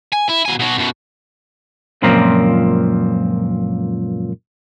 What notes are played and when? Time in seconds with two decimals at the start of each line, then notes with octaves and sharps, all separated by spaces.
0.13 G#5
0.29 E4
0.46 B2 G#5
0.60 B2 F#3
0.78 F#2 B2
2.02 C#2 F#2 A#2 F3 A#3 C4